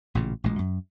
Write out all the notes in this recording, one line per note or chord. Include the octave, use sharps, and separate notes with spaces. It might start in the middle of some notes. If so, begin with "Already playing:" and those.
A1 A#2 C#3
A1 A#2 G#3
F#2